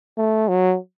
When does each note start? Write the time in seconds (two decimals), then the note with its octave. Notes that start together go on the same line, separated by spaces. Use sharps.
0.17 A3
0.48 F#3